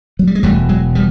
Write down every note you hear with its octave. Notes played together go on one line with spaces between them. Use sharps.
F#3
G3
G#3
E1 E2 B2 G3 A3
F#3 G#3
F3 G3